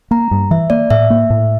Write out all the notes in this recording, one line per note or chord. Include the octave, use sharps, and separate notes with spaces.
A#3 A#5
G2
E3 E5
A#3 D5
A2 E5
A#3
A2